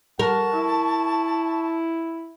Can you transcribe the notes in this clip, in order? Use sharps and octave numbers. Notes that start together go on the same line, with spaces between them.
A#4 F#5 A5 C#6
E4